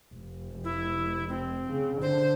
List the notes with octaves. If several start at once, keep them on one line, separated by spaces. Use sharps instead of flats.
F1
E4
C4
C#3
D3 C5